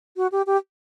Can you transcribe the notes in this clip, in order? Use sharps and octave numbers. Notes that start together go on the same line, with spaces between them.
F#4
G4
G4